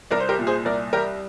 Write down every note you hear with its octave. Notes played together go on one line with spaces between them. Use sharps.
C2 A#4 D5
C5
G4 A#4
A#2
G#4 C5
C2 A#4 D5
G3 G4 A#4